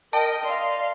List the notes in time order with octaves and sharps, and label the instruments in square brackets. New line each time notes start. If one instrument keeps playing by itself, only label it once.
[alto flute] A#4 [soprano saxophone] D#5 [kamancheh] G5 [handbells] A5
[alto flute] D5 [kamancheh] F5 C6